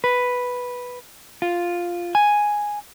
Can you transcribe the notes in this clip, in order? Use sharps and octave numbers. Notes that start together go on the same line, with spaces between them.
B4
F4
G#5